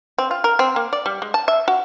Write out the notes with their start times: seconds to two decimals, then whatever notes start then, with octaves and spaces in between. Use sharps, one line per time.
0.18 C4
0.31 F4
0.44 A#4
0.59 C4
0.76 A#3
0.93 D5
1.06 G3
1.22 G#3
1.34 A5
1.48 E5
1.68 F#4